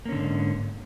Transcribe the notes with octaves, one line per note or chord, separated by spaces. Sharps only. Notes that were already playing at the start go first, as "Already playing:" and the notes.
G#2 D3 A#3 C#4